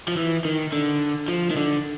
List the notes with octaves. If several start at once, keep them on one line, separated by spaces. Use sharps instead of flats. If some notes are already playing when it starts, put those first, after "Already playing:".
F3
E3
D#3
D3
F3
D#3
D3